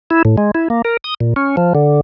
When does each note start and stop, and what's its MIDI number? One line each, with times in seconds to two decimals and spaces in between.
0.11 0.22 64
0.25 0.36 45
0.38 0.51 56
0.55 0.68 64
0.70 0.82 58
0.85 0.97 70
1.04 1.14 87
1.20 1.34 46
1.36 1.56 61
1.57 1.73 53
1.75 2.01 50